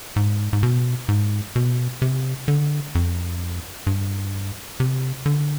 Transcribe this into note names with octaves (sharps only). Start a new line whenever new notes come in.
G#2
G#2
B2
G#2
B2
C3
D3
F2
G2
C3
D3